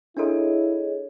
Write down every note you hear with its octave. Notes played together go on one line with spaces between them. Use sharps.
D4 E4 G#4 A4 C#5 D#5